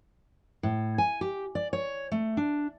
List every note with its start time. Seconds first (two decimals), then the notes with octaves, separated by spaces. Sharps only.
0.63 A2
0.98 G#5
1.21 G4
1.55 D5
1.73 C#5
2.12 A3
2.37 D4